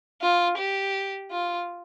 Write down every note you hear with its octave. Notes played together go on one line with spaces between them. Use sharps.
F4
G4
F4